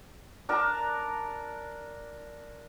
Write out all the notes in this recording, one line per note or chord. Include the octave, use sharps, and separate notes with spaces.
D4 A#4 A5 A#5